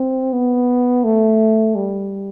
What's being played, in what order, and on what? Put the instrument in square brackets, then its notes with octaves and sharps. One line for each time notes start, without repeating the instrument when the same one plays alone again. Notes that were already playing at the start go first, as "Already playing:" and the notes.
Already playing: [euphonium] C4
B3
A3
G3